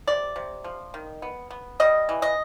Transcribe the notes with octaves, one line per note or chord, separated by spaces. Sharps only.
C3 D5
C3
F3
D#3
B3
B3
G3 D#5
E3
D#5